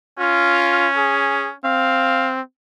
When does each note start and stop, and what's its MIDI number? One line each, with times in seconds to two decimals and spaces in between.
0.19 1.53 61
0.19 0.88 65
0.96 1.48 68
1.64 2.41 60
1.64 2.30 77